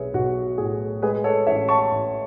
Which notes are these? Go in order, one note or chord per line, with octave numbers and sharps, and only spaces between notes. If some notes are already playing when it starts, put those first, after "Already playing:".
Already playing: B1 G#4 B4 C#5 E5
B1 F#4
A2 G#4
G#3 G#4 B4
A4 C#5
A1 C#5 E5
A5 C#6
A1